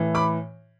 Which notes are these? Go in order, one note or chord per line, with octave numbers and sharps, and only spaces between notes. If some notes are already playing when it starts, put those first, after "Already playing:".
Already playing: A2 E3
B5 D6